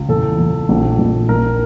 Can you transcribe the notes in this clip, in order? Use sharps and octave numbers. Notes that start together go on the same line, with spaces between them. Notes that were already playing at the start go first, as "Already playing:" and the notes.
Already playing: C#2
E2 A4
E2
A#1
A#1
A#1 A#4